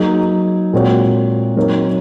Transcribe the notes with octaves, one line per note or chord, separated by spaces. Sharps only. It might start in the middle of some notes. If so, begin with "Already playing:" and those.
Already playing: F#3 A#3 D#4 G#4
A#2 G#3 C4 F#4 C#5
F#3 C4 D#4 A#4 C#5